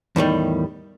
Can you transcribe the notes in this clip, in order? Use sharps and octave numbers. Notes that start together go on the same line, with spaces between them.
E2 A2 D#3 G3